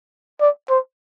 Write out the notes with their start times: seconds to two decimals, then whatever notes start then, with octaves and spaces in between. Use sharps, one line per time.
0.41 D5
0.70 C5